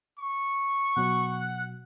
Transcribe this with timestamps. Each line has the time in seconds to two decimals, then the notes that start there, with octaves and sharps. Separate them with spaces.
0.19 C#6
0.97 B2 F#3 F#5